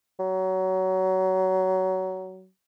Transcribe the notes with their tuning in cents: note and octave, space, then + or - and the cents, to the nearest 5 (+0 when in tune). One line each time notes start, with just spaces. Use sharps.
F#3 +20